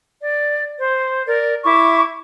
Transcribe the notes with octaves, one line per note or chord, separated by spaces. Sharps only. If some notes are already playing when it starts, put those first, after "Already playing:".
D5
C5
A#4 D5
E4 E5 C#6 D6